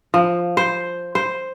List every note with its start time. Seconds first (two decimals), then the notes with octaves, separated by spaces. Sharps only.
0.14 F3
0.57 C5
1.15 C5